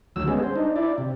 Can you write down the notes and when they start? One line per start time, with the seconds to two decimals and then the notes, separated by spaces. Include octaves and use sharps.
0.16 D2 F#3 E6
0.28 G3 G#3 B3 C#4 G#4
0.43 C5
0.56 D4 D#4
0.76 E4 D5
0.98 C3